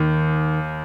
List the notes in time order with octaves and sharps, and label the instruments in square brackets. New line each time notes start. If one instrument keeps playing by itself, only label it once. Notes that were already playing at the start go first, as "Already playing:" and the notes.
Already playing: [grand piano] D#2 [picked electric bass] D#3